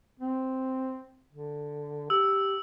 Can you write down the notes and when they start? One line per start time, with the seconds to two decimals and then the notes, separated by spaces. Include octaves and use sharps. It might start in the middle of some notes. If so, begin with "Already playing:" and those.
0.20 C4
1.32 D3
2.10 G4 E6